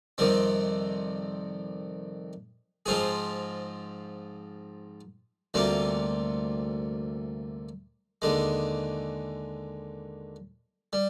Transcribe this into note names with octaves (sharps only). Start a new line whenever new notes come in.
F2 C3 D#3 G3 C4
G#2 F3 C4 F4 G#4
D2 C3 G3 A#3 F4
D#2 D3 G#3
G3